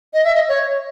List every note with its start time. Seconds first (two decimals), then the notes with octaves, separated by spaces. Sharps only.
0.14 D#5
0.24 E5
0.35 D#5
0.49 C#5